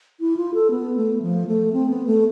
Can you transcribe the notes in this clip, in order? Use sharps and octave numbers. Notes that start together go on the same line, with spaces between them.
E4
F4
A4
B3
A3
F3
A3
C4
B3
A3